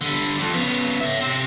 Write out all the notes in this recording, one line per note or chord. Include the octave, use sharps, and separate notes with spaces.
D3 G3
F2
C#3 B3
C#5 E5
C3 C4